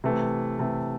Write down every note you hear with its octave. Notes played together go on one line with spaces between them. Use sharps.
C3 E3 A3
C3 E3 A3